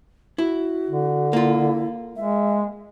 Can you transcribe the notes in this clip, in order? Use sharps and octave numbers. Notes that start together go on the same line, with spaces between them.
E4 F#4
D3
A#3 E4 F4
G#3 E5